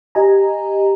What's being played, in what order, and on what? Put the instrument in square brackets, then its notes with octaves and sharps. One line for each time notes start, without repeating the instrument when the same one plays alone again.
[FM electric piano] G4 D#5 G#5 A#5